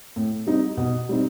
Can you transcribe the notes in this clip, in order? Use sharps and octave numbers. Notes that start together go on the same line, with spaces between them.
A2
G3 C4 D#4
B2
G3 C4 D#4